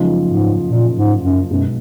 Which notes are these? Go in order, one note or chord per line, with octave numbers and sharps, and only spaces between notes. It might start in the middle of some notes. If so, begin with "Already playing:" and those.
Already playing: F#1 F#2 F3 G#3 D#4
G#2
A#2
G#2
F#2
B1 F#2 B2 G#3 B3